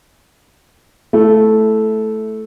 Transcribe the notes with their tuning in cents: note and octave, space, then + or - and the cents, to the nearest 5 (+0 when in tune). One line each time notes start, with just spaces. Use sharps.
A3 -10 E4 +0